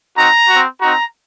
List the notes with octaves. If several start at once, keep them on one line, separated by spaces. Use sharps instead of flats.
C4 D#4 F#4 A#5
C4 F#4
C4 D#4 F#4 A#5